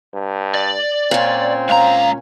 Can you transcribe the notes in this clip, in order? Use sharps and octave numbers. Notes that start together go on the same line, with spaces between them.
G2
D5
A#2 C4 C#4
C#2 F5 A#5